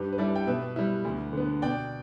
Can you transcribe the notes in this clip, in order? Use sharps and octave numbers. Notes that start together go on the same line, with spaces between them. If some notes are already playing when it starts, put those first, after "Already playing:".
Already playing: G2 G4 B4
B4
G3 E4 A4 D5
G5
B2 B4 E5
G3 E4
D2
D3 B3
B2 D5 G5